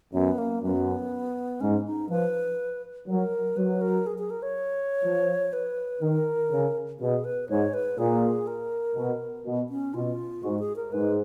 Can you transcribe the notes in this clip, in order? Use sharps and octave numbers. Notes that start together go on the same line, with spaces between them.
F#2 B3
A#3
F#2 B3
G#2 C#4
D#4
F3 B4
F#3 A#4
F#3 B4
A#4
G#4
G#4
A#4
C#5
F3
B4
D#3 A#4
C#3
B2 G#4
B4
G#2 C#5
B4
A#2 G#4
A#4
B2
B2
C#4
B2 F4
G#2 F#4
G#4
A#4
G#2 B4